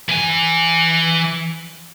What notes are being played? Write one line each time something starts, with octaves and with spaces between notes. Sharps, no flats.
E3 G#5